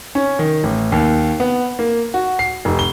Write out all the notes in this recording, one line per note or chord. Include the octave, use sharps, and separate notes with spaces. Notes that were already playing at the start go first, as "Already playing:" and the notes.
C#4
D#3
A1
D#2
B3
A#3
F#4
C7
F1
G7